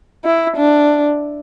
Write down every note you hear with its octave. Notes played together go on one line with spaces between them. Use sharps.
E4
D4